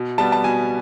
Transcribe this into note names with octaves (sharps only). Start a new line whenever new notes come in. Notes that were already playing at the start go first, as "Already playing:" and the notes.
Already playing: B2
G3 B3 A5
A5
B2 G#5